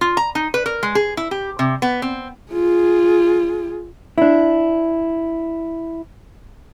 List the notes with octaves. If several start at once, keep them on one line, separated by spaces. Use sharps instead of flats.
F4
A#5
D#4
B4
A#4
G#3
G#4
E4
G4
C3
B3
C4
F4 G#4
D4 E4